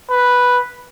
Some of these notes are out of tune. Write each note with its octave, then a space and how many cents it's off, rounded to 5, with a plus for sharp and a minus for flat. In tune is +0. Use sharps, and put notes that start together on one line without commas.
B4 -5